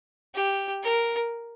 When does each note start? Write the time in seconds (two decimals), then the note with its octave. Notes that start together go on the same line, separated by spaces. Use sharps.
0.35 G4
0.83 A#4